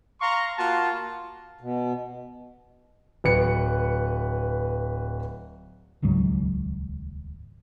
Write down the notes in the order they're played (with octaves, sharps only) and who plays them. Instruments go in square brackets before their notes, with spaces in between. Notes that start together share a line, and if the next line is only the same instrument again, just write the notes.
[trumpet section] F5 A#5 C6 C#6
A#3 F4 F#4 A5
[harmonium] B2
[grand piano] D1 B4 C#7
[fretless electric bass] D#1 C#2 G#2 F#3